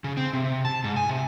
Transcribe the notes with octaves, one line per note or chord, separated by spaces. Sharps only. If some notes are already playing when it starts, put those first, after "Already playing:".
C#3
C4
C3
A5
G#2
G#5
C3